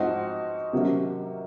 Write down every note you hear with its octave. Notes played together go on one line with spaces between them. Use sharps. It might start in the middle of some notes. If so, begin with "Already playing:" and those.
Already playing: G#2 F3 C4 D#4 F#4
C3 D#3 F#3 A#3 C#4